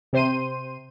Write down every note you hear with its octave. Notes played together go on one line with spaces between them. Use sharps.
C3 C5 C6 D#7